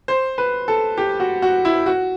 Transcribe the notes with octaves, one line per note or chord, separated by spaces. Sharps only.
C5
B4
A4
G4
F#4
F#4
E4
F#4